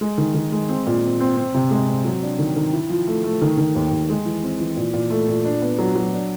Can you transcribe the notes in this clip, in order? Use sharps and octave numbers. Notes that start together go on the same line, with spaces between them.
G#3
D#3
D#3
G#3
C4
A#2
C4
C4
C4
C3
G#3
C4
F#3
D4
D#3
D#3
E4
F3
A3
A3
D#3
D#3
D#2
D#2
G#3
E3
C4
E3
A#2
A#2
A3
A#2
D4
B3
F#3
F#3
D4